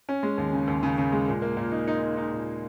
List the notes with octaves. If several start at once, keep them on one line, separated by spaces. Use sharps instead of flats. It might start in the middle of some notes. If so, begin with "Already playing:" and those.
C#4
G#3
D#2
C#3
D#2
C#3
C#3
G#3
A#2
A#3
A#2
D#4
D#4
D#4
D#4
A#2